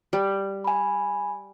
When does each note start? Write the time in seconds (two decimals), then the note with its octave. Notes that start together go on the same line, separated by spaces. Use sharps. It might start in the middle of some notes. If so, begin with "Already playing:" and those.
0.13 G3
0.64 G#5 B5